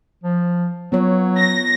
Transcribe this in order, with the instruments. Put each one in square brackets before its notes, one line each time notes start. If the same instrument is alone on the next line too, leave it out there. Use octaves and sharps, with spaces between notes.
[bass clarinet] F3
[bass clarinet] F#3 [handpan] B3 F4 C#5
[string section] A#6